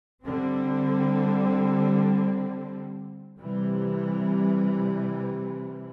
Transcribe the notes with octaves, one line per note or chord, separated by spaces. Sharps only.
D3 G3 C4
C3 E3 G3